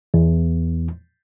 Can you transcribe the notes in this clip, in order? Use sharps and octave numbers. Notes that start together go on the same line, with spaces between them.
E2